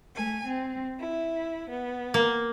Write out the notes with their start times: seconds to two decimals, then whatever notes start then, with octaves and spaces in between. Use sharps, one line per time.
0.15 A3 G#5
0.47 C4
1.00 E4
1.70 B3
2.14 A#3